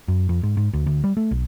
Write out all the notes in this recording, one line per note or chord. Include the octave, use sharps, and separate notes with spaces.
F#2
F2
G#2
G#2
D2
D2
G3
A3
B1